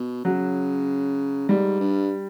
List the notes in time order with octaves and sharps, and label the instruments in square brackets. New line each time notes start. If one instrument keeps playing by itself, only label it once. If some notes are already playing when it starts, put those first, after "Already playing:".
Already playing: [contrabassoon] B2
[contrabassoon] C#3 [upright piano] F#3
[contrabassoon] G#2 [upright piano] G3
[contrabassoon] G2